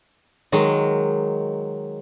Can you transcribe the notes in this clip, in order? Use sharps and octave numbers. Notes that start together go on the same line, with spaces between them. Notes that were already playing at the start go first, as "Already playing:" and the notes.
D#3 F#3 G#3